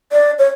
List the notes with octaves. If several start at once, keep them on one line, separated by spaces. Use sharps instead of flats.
D5
C#5